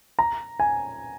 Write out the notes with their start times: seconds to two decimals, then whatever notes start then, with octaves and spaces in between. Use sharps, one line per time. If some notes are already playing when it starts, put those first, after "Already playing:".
0.19 A#5
0.60 G#5